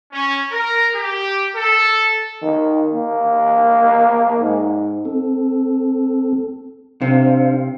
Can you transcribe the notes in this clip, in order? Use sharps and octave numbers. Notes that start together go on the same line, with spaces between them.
C#4
A#4
G4
A4
D#3
A#3
G#2
C4 A4
C3 D4 C5 F5